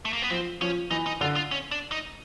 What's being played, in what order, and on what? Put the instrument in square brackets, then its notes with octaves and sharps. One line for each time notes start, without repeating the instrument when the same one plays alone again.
[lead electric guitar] A3
A#3
B3
[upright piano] F3 [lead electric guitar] C4
[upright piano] F3 [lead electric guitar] C#4
[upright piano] E3 [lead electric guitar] D#4
[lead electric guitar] D#4
[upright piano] D3 [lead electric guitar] F4
[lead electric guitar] F4
C#4
D4
D#4